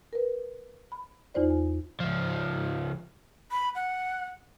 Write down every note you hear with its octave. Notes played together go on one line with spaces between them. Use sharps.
A#4 B4
B5
E2 D#4 F4 C5 D5
G#5
C#2 F3
B5
F#5